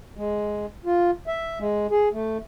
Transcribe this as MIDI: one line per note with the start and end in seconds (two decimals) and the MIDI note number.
0.17 0.66 56
0.85 1.11 65
1.27 1.59 76
1.60 1.87 56
1.91 2.08 68
2.13 2.37 57